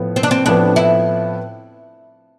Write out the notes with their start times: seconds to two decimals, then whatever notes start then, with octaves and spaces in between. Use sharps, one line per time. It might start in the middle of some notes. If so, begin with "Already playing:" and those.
Already playing: A2 F3 B3
0.16 C4
0.23 D4
0.31 C4
0.46 A2 F3 B3 D4
0.76 E4